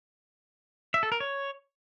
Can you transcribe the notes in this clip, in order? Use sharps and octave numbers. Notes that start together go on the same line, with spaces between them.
E5
A4
A#4
C#5